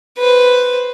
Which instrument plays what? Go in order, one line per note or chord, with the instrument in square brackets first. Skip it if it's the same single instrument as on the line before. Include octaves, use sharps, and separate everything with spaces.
[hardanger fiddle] B4 C5